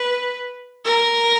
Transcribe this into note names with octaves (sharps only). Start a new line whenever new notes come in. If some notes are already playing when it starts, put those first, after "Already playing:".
Already playing: B4
A#4